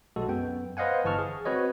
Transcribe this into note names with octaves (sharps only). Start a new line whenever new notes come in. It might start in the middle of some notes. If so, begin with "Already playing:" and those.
B1 G#3 F#4 A4
F#2 B3 G5
B4 C5 D#5 F5 F#5 G#5
G1 E3 A5 C#6 F6
G#4
C4 F#4 B4 C#5 D#5